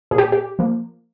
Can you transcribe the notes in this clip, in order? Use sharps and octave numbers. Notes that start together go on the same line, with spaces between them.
A#2 G#4
G4
G4
F3 A#3